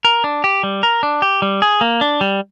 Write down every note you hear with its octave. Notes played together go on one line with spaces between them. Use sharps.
A#4
D4
G4
G3
A#4
D4
G4
G3
G#4
A#3
D4
G3